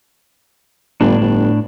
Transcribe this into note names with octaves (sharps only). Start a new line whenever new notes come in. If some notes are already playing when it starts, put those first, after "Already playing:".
G1 A2 D4
G1